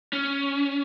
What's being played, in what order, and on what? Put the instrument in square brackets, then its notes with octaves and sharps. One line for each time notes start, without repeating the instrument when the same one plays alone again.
[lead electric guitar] C#4